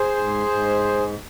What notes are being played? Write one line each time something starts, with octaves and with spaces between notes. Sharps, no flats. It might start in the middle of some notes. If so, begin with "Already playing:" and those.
Already playing: G#4 C5
G#2
G#2